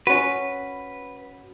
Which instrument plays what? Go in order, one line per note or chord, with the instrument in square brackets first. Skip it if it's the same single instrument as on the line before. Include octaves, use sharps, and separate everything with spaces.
[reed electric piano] C#4 F#4 [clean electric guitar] B4